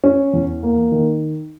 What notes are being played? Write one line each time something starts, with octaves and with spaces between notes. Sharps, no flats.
C#4
E2
A#3
D#3